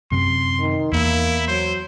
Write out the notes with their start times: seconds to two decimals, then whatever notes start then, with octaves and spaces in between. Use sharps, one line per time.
0.12 F#2 C3 C6
0.60 D#3
0.93 E2 A#3 E4
1.48 F#3 C5